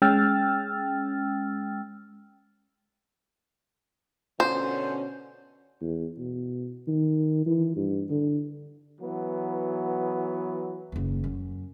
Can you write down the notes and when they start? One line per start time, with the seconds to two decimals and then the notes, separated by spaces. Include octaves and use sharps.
0.02 G#3 C#4 G5 E6 F6 A6
4.40 B2 D3 C#4 C5
5.81 E2
6.18 B2
6.87 D#3
7.46 E3
7.76 G2
8.10 D3
9.01 E3 F#3 B3
10.92 F#1 D#2
11.24 F#2